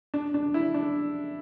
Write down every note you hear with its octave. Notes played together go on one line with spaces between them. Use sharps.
D4
D4
E4
D4